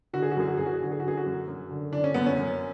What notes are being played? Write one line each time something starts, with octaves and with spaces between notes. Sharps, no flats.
D3 F#4
G#4
F#4
F#2 G#4
F#4
F#2 G#4
F#4
G#4
D3 F#4
G#4
D3 F#4
G#4
F#4
F#2
F#2
D3
D3 D4
C#4
F#2 B3
C#4
F#2